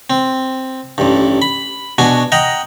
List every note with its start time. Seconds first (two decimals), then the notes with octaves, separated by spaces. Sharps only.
0.10 C4
0.98 A1 G2
1.42 B5
1.98 B2 D4 F#4 G#5
2.32 D#5 F#5 G5 A#5